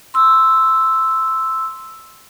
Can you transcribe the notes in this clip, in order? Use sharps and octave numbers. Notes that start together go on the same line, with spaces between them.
C6 E6